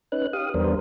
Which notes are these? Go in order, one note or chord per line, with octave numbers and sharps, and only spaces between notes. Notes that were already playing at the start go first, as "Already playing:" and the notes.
C#4 D#4 B4 F#6
G4 F5 D#6
E2 G3 B3 D4 A#4 C5